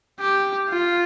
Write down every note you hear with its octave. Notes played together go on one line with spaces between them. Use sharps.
G4
F4